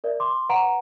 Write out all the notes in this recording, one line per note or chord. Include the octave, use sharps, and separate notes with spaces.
A#4 D5 E5
C6 D6
B4 F#5 A#5 D7